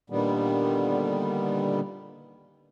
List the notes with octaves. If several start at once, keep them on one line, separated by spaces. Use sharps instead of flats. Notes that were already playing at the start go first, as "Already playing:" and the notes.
A#2 D3 D#3 G3 B3